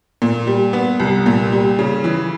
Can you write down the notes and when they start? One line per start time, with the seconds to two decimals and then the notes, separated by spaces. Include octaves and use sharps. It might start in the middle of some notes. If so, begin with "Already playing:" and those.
0.22 A#2
0.47 G3
0.73 B3
1.00 C2
1.26 A#2
1.52 G3
1.79 C#3
2.04 E3